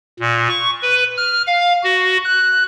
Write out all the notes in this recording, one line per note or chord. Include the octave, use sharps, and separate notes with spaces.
A#2
C#6
B4
F6
F5
F#4
F#6